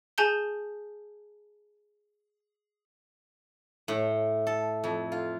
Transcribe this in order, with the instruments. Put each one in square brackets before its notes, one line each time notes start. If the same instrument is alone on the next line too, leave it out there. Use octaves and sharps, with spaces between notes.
[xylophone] G#4 G#5 A5 G6 G7
[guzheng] A2
A4
F2
F4